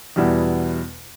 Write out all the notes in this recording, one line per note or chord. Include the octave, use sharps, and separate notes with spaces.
E2 B2 G3 B3 E4